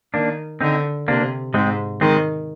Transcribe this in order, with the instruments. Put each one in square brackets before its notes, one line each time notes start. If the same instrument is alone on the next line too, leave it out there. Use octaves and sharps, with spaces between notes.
[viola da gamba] D#3 [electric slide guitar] A#3 D4
[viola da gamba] D3 [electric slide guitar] C4 D#4
[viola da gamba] C3 [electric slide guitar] A#3 D4
[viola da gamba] G#2 [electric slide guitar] G#3 C4
[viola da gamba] D#3 [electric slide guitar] G#3 C4